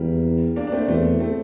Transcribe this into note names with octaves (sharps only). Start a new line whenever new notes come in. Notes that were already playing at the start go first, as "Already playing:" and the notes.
Already playing: E2 G3 A#3
A#3 D4
D4
A3 C4
E2 A3 C4
A3 C4